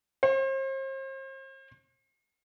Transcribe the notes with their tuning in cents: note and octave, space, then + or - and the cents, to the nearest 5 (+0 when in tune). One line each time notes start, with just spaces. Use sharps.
C5 +40